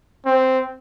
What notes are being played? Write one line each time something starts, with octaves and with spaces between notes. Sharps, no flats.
C4